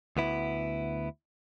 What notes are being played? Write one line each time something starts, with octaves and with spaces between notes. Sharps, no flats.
D2 B3 E4